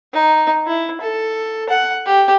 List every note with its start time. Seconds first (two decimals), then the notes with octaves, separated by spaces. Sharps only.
0.13 D#4
0.67 E4
1.01 A4
1.70 F#5
2.06 G4